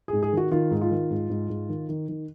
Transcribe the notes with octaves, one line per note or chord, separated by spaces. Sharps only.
G#2 G#4
G#4
D#3 F#4
D#3 F4
G#2
F4
D#3
G#2
G#2
G#2
D#3
D#3
D#3